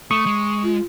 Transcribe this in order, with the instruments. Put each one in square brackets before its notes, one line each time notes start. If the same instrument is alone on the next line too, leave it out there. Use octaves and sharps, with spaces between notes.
[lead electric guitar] A3 [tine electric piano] C#6 D#6
[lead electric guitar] G#3
[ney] F4